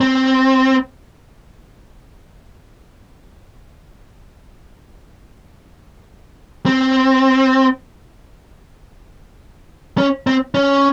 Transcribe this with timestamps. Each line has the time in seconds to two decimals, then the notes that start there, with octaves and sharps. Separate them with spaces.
0.01 C4
6.66 C4
9.98 C#4
10.27 C4
10.54 C#4